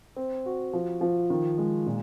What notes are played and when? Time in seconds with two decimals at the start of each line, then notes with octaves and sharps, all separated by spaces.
0.16 C4
0.46 F#4
0.73 F3
1.01 F3
1.30 D#3
1.58 G#3
1.86 A#2